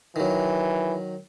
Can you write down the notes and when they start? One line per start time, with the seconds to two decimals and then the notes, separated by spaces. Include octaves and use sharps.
0.16 D#3 E3 F#3